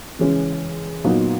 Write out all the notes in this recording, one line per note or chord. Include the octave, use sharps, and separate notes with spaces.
C#3 E3 G#3 C#4
A#2 F#3 B3 D#4